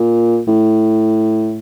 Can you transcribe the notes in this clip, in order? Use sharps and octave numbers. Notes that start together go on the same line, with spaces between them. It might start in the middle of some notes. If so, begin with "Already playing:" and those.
Already playing: A#2
A2